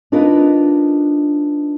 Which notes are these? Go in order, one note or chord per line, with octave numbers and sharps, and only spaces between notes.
D4 D#4 F4 A#4 B4 D#5